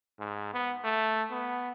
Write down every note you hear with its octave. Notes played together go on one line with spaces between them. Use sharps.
G#2
B3
A3
B3